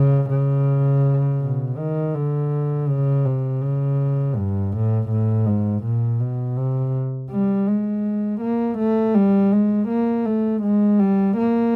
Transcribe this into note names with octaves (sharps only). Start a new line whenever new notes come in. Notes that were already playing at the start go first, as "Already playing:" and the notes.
Already playing: C#3
C#3
B2
D#3
D3
C#3
C3
C#3
G2
A2
A2
G#2
A#2
B2
C3
G3
G#3
A#3
A3
G3
G#3
A#3
A3
G#3
G3
A#3